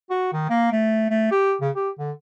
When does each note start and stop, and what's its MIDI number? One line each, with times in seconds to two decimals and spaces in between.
0.10 0.30 66
0.32 0.46 51
0.49 0.72 58
0.72 1.09 57
1.10 1.30 57
1.31 1.55 67
1.61 1.70 49
1.75 1.89 67
1.98 2.11 50